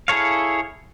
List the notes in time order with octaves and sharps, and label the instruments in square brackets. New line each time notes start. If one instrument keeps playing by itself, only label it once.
[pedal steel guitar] E4 G#4 A4 C#5 F5